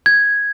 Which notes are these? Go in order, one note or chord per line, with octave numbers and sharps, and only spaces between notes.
G#6